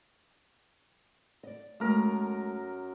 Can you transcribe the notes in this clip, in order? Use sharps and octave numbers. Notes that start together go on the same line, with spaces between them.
D5 D#5
F#2 G#3 A3 A#4